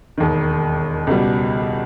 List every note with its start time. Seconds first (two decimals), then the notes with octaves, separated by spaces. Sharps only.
0.18 E1 D#2 D#3
1.07 C#2 B2 G3